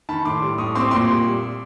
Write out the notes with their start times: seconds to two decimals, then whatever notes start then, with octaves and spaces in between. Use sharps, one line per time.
0.09 D#3 A5 B5
0.25 A2 C6 D6
0.42 G3
0.58 A2 C#6 D#6
0.75 C4 C6 D6
0.91 A#2 C6 D6
1.09 G3